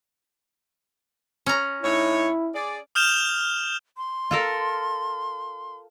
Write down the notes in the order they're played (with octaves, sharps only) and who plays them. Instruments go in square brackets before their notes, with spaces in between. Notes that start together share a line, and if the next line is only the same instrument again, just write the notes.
[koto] C#4 A#5
[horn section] A2 D#4 C#5 [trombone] E4
[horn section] G#4 D5
[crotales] D#6 F6 G6 E7 F7 G7
[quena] C6
[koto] F4 A4 A#4